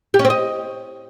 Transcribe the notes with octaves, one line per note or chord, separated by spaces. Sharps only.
G4
C#4
C4
D#5